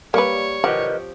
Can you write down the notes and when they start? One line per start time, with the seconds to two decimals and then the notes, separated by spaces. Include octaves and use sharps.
0.14 G3 A#3 B4 C#5
0.64 F3 C4 G4 A#4 B4 D#5 F#5